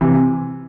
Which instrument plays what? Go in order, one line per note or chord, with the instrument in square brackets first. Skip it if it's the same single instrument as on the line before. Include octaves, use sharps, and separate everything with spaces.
[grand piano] C3 E3 [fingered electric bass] C4